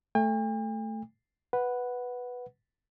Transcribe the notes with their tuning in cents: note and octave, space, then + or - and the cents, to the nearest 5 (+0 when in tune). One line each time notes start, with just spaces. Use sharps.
A3 +0 G5 +45
B4 +0 F#5 +0